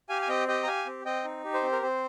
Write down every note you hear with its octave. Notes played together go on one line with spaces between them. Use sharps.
G4 F5 G#5
G#5
C4 D#5 G5
G4 D#5 G5
A#5
G4 F5 G#5
C4
C4 D#5 G5
D#4
G4
C5
C4
A#4
C4 C5